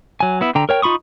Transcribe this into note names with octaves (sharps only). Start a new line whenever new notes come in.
F#3 G#5
B3 E4
D3 G5 A#5
A#4 C#5 G5
D#4 F4 B5 C#6 D#6